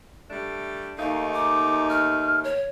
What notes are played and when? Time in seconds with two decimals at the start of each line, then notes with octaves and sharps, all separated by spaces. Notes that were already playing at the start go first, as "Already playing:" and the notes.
0.30 G3 A3 D4
0.99 D#2 A3 D#4 F5
1.33 D6
1.89 F6
2.44 C#5